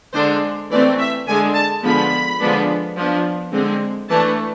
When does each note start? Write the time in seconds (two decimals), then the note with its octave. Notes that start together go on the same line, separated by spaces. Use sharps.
0.14 D3 G#3 D4 C5
0.71 E3 A3 C4 D5
0.99 E5
1.27 D3 G#3 D4 G#5
1.55 A5
1.83 D3 F3 G#3 B3 B5
2.39 D3 F3 G#3 B3 D4
2.97 F3 B3 D4
3.52 D3 G#3 C4
4.09 E3 A3 D4 A5